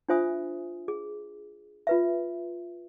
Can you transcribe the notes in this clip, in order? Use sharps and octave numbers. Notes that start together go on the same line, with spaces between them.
D4 F4 C5 E5 G#5 D#6
G#4
F4 B4 E5